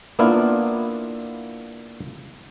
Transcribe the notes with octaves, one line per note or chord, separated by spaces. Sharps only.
A#3 B3 D4 E4 F4